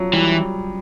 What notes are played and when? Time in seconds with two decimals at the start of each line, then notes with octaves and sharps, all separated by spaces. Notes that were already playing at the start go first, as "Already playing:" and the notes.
Already playing: F3 F#3
0.13 E3 G3